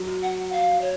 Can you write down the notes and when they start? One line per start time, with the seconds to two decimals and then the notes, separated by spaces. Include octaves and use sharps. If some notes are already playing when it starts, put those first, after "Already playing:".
Already playing: F#3
0.22 F#5
0.53 F5
0.81 C#5